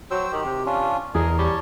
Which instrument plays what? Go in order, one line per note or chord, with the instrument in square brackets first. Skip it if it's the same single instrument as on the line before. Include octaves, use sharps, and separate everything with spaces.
[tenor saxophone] F#3 [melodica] C5 G5 E6
[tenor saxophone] D#3 [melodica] G4
[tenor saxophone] C3
[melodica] C#4 D4 F4
[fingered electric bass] E2 [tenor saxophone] G#4 [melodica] A#4 D#5
[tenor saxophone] G3 [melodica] C#5 A5